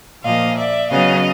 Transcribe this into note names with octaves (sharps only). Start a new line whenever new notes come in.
A#2 F3 A#3 D#5 F5
D5 E5
C#3 F#3 B3 D#5 F5